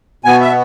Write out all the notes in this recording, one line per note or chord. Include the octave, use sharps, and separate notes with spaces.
B2 B3 G#5
E5